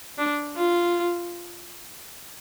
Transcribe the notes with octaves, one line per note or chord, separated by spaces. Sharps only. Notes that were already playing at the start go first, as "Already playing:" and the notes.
D4
F4